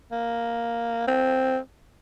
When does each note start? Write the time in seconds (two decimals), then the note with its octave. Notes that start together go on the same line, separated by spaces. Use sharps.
0.12 A#3
1.08 C4